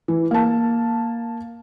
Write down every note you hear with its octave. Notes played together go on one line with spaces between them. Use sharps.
E3
A#3 A5